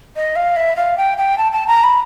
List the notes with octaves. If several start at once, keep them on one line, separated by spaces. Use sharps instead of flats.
D#5
F5
E5
F5
G5
G5
A5
A5
A#5
B5